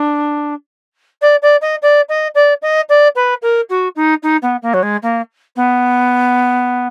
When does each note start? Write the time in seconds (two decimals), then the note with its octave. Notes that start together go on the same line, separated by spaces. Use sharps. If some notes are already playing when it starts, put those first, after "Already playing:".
Already playing: D4
1.21 D5
1.42 D5
1.61 D#5
1.82 D5
2.09 D#5
2.34 D5
2.62 D#5
2.89 D5
3.15 B4
3.42 A#4
3.69 F#4
3.95 D#4
4.22 D#4
4.42 B3
4.62 A#3
4.73 F#3
4.82 G#3
5.02 A#3
5.56 B3